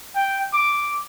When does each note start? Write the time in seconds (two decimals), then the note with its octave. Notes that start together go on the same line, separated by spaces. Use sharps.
0.15 G5
0.53 D6